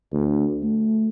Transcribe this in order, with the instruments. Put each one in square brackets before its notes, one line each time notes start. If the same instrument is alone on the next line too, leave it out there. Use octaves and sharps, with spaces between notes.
[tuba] D2
A3